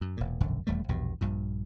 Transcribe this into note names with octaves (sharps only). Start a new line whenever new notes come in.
F#2
E1 A#2
E1 A#1 F#2 D3
D#1 E2 G3 A3
A#1 E2 G2 B2
A#1 G2 A#2